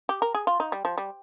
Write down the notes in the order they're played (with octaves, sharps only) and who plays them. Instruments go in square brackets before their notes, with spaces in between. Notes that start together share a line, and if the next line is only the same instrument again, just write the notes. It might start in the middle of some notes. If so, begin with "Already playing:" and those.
[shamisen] G4
A#4
G#4
F4
D#4
G3
F3
G3